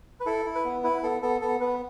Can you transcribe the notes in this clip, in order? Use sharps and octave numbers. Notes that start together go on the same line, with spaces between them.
B4
E4 A4
E4
B4
B3
E4 B4
B3 A4
B3 A4
B3 A4
B3 B4